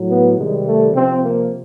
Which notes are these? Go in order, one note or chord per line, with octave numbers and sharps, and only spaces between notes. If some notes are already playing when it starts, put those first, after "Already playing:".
Already playing: A2 F#3
B3
C3 D#3 G3 G#3
A3
C3 F3 C4
A#3